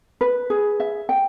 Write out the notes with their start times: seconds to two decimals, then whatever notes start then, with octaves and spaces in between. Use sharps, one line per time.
0.21 B4
0.50 G#4
0.80 E5
1.09 G5